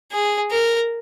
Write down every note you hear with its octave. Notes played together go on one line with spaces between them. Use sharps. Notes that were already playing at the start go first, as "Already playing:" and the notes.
G#4
A#4